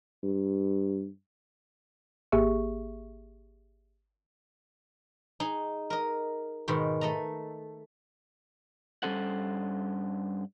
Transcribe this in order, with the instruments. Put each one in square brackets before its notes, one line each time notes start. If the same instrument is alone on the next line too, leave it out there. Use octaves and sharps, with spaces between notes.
[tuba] G2
[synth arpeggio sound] G#1 A#3 G4 G#4 E5 C#6
[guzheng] D#4 G#4
A#4 D#5
G#2 B2 D#3
A3 D#5 A#5
[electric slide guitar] G2 G3 C#4 A4 C5 F#5